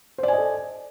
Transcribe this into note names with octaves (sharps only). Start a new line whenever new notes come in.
A4 C5 D5 D#5 G#5